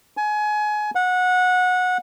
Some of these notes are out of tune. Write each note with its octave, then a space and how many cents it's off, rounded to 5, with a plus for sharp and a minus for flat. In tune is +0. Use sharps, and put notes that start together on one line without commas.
G#5 +25
F#5 -20